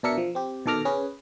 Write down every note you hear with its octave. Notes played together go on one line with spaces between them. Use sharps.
B2 D4 A#4 E5 C#7
F3
C4 G4
B2 D#3 A4 D6 F6 A#6
C#4 G#4 B4